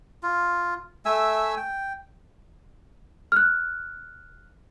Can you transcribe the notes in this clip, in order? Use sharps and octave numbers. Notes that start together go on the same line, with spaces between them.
F4
A3 E5 G#5 E6
G5
F6 F#6